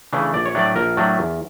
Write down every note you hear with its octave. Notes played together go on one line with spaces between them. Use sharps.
C#3 E3 A3 D4
A#1 D5
C#5
A2 F#3 A3 D4 D5
A#1 A#4
A2 F#3 A3 D4
E2